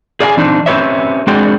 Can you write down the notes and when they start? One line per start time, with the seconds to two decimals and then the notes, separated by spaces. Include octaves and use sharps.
0.20 G#4 D5 F5 G5 G#5
0.37 E3 C4 D4 D#4
0.66 C4 C#4 G4 B4 C#5 E5
1.27 G#3 C4 D4 F#4 G#4 G5